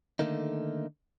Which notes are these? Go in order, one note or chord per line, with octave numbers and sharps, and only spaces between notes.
D3 D#3 A3 A#3 D#4